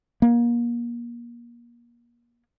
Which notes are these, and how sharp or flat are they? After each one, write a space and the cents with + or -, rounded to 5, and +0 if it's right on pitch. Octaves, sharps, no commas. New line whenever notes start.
A#3 +30